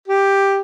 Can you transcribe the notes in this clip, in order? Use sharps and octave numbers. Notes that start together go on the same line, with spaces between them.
G4